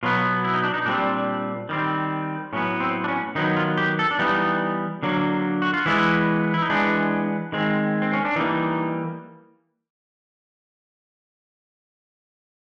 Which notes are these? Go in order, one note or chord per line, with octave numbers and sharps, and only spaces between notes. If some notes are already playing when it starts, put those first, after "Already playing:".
B2 F#3 B3 F4
E4
D#4
D4
D#4
A#2 G3 C4 D4
D#3 G3 C4
A2 F#3 B3 C#4
C4
D4
C#4
D#3 F#3 B3 D#4
F4
G4
A4
D4
E3 G3 B3 D#4
D3 F#3 A#3
F#4
F4
E3 G#3 B3 E4
E4
D#4
E3 G#3 B3 D4
D#3 G#3 C4
C4
C#4
D4
E3 G3 A#3 D#4